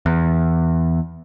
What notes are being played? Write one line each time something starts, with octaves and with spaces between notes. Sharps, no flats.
E2